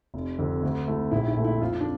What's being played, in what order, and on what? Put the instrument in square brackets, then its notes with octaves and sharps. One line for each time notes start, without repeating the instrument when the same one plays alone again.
[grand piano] F1
F2 D3
D2
D3 A3 E4
[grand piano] A#1 [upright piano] E4
[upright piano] E4
[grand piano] A#2 A3 C4
[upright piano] E4
[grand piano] F2 [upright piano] F4
[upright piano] D4